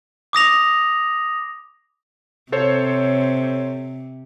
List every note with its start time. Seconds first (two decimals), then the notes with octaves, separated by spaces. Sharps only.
0.33 D6 D#6 A#6 F7
2.52 C3 A4 C5 C#5